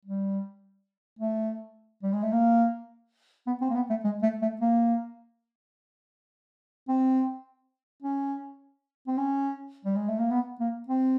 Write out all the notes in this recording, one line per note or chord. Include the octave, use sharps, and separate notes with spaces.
G3
A3
G3
G#3
A3
A#3
B3
C4
A#3
B3
A3
G#3
A3
A3
A#3
C4
C#4
C4
C#4
G3
G#3
A3
A#3
B3
A#3
C4